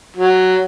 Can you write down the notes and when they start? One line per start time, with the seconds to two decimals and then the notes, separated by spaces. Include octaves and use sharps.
0.17 F#3